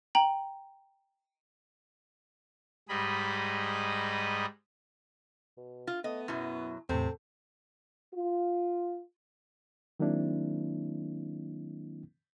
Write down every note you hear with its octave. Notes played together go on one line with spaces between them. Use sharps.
G5 A#5 F#7
G#2 G3 G#4 D#5 B5
B2
F4
A3 B3 D#5
F#2 B2 F#3 E4
E2 A2 C3 C4 A4
F4
D#3 F#3 A#3 C4 D4 E4